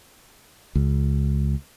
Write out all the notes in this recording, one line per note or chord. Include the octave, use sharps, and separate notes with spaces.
C#2